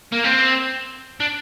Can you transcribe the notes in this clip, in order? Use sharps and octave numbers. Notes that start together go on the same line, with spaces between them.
A#3
C4
D4